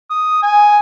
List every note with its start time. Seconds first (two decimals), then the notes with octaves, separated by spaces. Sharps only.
0.10 D#6
0.42 G#5